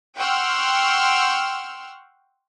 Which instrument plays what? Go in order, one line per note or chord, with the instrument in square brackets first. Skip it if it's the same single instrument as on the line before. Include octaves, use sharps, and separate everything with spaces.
[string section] F#5 G5 C6 C#6 E6 F6